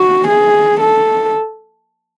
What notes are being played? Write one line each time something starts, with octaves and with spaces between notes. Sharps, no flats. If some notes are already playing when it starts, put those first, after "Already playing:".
Already playing: F#4
G#4
A4